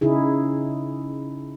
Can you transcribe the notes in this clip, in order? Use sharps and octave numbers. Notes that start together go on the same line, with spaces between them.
C#3 D#4 E4 G#4